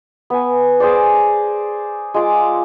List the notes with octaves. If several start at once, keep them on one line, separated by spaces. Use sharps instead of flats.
B3 G#5
G#4 C5 D5
A#5
G#3 F4 D6